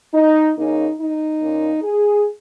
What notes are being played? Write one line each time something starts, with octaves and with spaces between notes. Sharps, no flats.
D#4
C#3 A#3 C#4 D#4
D#4
A#2 A#3 C#4
G#4